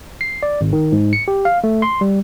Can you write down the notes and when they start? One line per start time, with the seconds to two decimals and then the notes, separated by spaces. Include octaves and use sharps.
0.21 C7
0.43 D5
0.61 G#1
0.73 D#3
0.92 G#2
1.13 C#7
1.28 G4
1.45 F5
1.64 A3
1.82 C6
2.01 G3